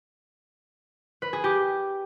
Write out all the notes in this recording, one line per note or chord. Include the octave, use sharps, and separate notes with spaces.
B4
G#4
G4